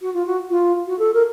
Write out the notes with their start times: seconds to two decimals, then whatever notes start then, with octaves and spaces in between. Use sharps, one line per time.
0.01 F#4
0.14 F4
0.26 F#4
0.50 F4
0.87 F#4
0.98 A4
1.14 A#4